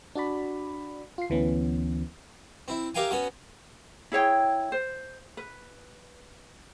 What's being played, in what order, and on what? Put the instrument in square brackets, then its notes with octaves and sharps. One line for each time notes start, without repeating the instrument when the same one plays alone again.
[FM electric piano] D4 F#4 D5 B5
F4 C7
D2 E3 B3 C#4
[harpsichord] C4 E4
G4 A#4 E5 F5 G5 G#5
B3 C#4 F#4
[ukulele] E4 G#4 C#5 G5
C5
B4